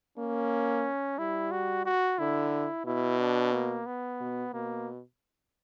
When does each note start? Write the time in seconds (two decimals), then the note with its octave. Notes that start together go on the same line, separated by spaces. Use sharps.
0.18 A#3 C#4
1.18 G3 E4
1.51 F#4
1.86 F#4
2.19 D3 E4
2.86 B2 E4
3.19 D4
3.53 A#3
3.86 B3
4.20 B2
4.54 B2 A#3